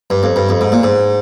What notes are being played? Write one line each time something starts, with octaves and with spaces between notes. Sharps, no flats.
G2
F2
G2
F2
G#2
A#2
G#2